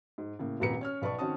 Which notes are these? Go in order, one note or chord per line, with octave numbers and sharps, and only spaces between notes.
G#2
A2 C#3 A#3
D#1 G#1 A#2 B4 A#5 C#7
C#4 C#5 F6
B1 B4 D5 A5 C#6
D#3 C4 C#4 F#4 A5 D#6